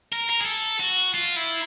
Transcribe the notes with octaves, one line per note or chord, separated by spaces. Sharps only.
A#4
A#4
G#4
A4
F#4
F4
E4